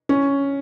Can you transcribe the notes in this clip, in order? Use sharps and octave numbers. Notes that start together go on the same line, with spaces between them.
C#4